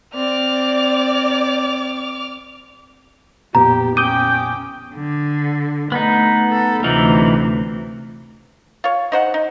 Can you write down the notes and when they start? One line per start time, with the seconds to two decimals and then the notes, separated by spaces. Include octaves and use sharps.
0.15 C4 D5 D6 F6
3.55 F2 A#2 B3 G4 A#5
3.97 C#4 G5 D6 D#6 G6 D#7
4.95 D3
5.92 A3 B3 D#4
6.51 A4
6.84 D2 C3 E3 D#4 F4
8.84 F4 C#5
9.12 D#4 C5 F#5
9.34 D#4